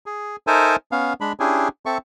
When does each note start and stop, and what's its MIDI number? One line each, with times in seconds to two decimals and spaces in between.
0.06 0.36 68
0.47 0.76 63
0.47 0.76 69
0.47 0.76 70
0.47 0.76 72
0.47 0.76 76
0.47 0.76 80
0.92 1.13 59
0.92 1.13 61
0.92 1.13 77
1.21 1.33 56
1.21 1.33 62
1.21 1.33 83
1.40 1.68 61
1.40 1.68 62
1.40 1.68 64
1.40 1.68 67
1.40 1.68 68
1.86 1.98 60
1.86 1.98 69
1.86 1.98 76
1.86 1.98 85